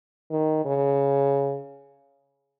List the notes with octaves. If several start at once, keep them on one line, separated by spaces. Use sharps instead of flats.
D#3
C#3